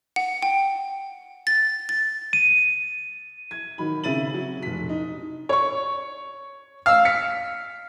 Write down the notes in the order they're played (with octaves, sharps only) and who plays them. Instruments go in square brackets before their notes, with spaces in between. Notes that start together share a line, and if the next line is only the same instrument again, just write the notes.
[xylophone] F#5
G5
A6
A6
[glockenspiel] D#7
[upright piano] G#6
D#3 F#3 B5
C#3 C4 E5 A6 D#7 F#7
F#3
F1 B6
D#4
[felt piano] C#5 C#6
[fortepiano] F5 E6
[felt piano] B6 C#7